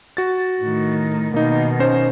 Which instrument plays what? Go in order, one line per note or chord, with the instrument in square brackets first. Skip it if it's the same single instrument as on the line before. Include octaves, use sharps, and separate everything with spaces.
[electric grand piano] F#4 A6
[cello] A2 D#3
[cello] B2 D#3 [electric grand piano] A#3 D#4
[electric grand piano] C#4 D#4 C5